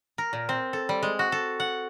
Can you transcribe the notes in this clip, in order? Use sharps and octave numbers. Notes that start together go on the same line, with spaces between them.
A#4
A#2
C4
A4
G3
G#3
F#4
A4
F#5